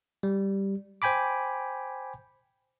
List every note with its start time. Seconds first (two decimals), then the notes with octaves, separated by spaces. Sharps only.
0.23 G3
1.02 C5 G5 G#5 B5 D6